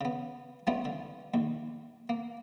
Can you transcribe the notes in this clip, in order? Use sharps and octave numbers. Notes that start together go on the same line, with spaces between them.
C#3 B3
F3 G3 A3 B3 C#4 F4
D3
A#1 D#2
A#3